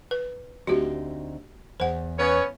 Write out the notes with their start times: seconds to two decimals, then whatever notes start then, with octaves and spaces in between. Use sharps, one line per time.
0.11 B4
0.67 D2 C4 D#4 F#4 G4
1.80 E2 C5 F#5
2.19 B3 C#4 C#5